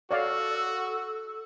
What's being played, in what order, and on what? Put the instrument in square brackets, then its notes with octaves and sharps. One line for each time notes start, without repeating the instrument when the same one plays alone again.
[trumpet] F#4 [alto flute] A4 [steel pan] C#5 D5 F5